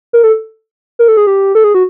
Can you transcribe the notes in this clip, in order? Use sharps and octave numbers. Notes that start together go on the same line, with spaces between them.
A#4
A4
A#4
A4
G#4
G4
A4
G#4
F#4